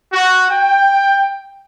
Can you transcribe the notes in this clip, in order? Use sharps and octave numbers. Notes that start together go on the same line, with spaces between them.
F#4
G5